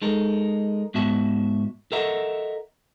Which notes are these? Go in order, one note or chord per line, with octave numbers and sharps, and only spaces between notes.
G#3 D#4 A4 A#4
G#2 B3 F#4 E5 A5
A4 A#4 D#5 E5 F#5 A#5